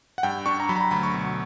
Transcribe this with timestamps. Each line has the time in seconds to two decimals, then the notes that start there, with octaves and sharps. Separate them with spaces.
0.18 F#5
0.23 G2 G5
0.46 D4 C#6
0.60 A#5
0.69 F#3 B5
0.76 A#5
0.81 B5
0.91 D2 B5
1.03 C#6
1.14 B2